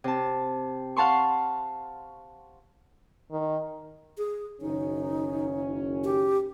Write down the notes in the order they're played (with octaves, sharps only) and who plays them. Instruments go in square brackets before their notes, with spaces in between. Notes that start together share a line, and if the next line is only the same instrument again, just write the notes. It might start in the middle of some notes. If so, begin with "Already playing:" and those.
[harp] C3 A5
F5 F#5 A5 C6 C#6
[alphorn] D#3
[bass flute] G#4
[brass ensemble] F#1 D#3 C#4 [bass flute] D#4
[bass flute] G4